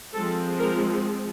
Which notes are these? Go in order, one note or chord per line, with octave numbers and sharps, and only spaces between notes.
F3 G#3 C4 A4
A#4